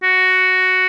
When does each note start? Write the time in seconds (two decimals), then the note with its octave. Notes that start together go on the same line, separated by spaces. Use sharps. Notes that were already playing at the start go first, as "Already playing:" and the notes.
0.03 F#4